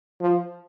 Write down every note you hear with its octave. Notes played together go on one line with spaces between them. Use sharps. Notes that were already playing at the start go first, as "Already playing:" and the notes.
F3